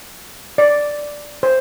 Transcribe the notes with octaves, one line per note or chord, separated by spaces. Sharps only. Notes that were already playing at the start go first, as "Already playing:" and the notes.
D5
C5